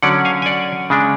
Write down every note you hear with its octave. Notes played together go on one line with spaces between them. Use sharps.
D3 F#3 C#4 D5 F#5
F5 G#5
G#5
D5 F#5
C#3 G#3 D4